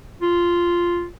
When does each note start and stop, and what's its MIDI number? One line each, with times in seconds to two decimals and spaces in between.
0.21 1.05 65